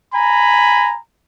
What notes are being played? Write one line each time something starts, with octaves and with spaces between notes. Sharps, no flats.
G#5 A#5 B5